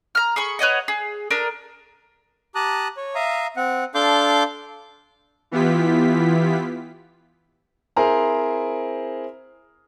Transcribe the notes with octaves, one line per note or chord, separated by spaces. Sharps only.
A#5 F6
G#4 B5 C#6
B4 C#5 D#5 F#5
G#4
D4 A#4 A#5 D#6
G4 A5 A#5 D#6 F#6
C#5
E5 F5 A#5 D#6
C4 F#5
D4 A4 F5 C6 D6 G6
E3 B3 E4 F4 G4 B6
C4 E4 G#4 A#4 C5 A#5